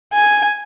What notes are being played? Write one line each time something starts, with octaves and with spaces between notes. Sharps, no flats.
G#5